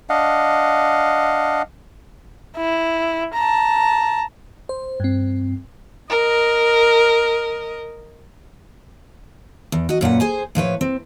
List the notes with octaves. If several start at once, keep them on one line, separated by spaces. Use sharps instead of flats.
D4 D#5 F5 F#5
E4
A5 A#5
C5
G2 C4
A#4 D#5
E2
F#4 D#5
F#2 A#2 B4 F#5
G#4 C5 G#5
A2 F3 B4 C#5
C4